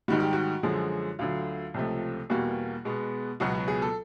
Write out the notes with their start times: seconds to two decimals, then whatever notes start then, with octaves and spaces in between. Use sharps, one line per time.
0.08 G#2 D#3 G3 F#4
0.20 G4
0.33 F#4
0.63 F#2 D3 F3 G#3
1.19 D2 D3 F#3 F4
1.74 C#2 C3 F3 A3
2.30 E2 B2 G3 A#3 F#4
2.85 B2 G#3 B3
3.40 C#2 B2 F#3 B3 F#4
3.55 F#4
3.68 G#4
3.82 A4